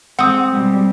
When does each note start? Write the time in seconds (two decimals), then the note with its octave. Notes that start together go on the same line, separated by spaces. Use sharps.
0.19 G#3 C4 F#5 D#6
0.51 B2 G3 G#3